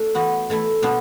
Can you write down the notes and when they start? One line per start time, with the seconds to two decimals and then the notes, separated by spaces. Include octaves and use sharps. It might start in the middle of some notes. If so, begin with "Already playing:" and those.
Already playing: A3 D4
0.15 E3 B3 F#4
0.50 E3 A3 E4
0.82 B2 B3 D4